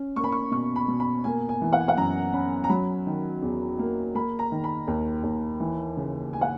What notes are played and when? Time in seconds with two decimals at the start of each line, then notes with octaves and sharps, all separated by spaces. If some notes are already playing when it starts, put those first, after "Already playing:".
Already playing: C#4
0.16 A#3 C#6
0.24 B5
0.32 C#6
0.51 B2 C#6
0.76 B5
0.88 B2
1.00 B5
1.24 A#3 G#5
1.49 G#5
1.62 E3
1.73 F#5
1.80 G#5
1.88 F#5
1.97 F#2 A#5
2.33 C#4 B5
2.64 A#5
2.69 F#3 B5
3.07 D#3
3.42 E2
3.79 A#3
4.15 A#3 B5
4.39 A#5
4.52 D#3
4.64 B5
4.87 D#2
5.23 D#2
5.60 E3
5.97 C#3
6.33 G#5
6.41 F#5